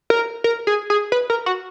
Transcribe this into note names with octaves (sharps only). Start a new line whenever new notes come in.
A#4
A#4
G#4
G#4
B4
A#4
F#4